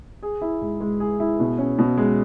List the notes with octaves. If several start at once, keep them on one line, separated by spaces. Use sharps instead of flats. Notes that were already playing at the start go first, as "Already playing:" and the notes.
G#4
E4
G#2
G#3
G#4
E4
B2
C#4
B2
G#3